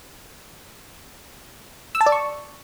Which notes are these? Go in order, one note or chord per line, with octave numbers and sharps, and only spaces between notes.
E6
A5
D5
C#6